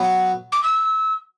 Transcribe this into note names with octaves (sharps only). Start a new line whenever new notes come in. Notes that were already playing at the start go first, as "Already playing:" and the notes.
Already playing: F#3 B3
D6
E6